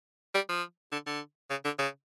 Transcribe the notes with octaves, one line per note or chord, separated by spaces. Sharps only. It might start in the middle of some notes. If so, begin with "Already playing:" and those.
G3
F3
D3
D3
C#3
D3
C#3